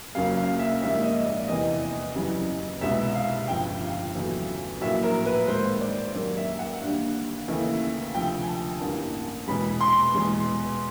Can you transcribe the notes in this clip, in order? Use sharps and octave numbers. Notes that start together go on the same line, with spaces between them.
F#1 F#2 C#3 F#3 A#3 F5
F5
E5
A#1 G#2 D#3 G3 A#3 E5
D#5
D5
F1 E2 C3 E3 D#5
F#2 C#3 E3 G3
C2 B2 G#3 E5
F5
G1 F2 C#3 G5
F5
E2 C#3 F#3 A3
A#1 A2 F#3 A#3 E5
A#4
B4
D#2 D#3 G#3 C5
D5
F#2 D#3 G3 A#3 D5
E5
F#5
D#2 D3 G3
D#2 C#3 E3 A3
D2 C3 F3 G5
G#5
A5
A1 G2 E3 G3 A#3
E2 B2 G#3 B5
C6
E2 B2 G#3